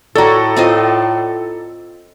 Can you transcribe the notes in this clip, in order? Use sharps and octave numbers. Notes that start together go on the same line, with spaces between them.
A2 F#4 A4 C#5 D5 A#5
C4 F4 D#5